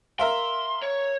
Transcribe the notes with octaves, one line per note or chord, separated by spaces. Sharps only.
A#4 E5 F5 C6
C#5